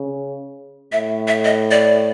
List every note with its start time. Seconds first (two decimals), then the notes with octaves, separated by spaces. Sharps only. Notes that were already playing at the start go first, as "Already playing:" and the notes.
Already playing: C#3
0.92 A2 E5
1.28 E5
1.45 D#5
1.71 D5